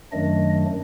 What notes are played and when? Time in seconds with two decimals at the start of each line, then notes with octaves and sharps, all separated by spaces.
0.12 F#2 D#3 F#3 A3 D4 D#5